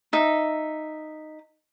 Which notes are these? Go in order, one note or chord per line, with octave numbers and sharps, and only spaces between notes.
D#4 E5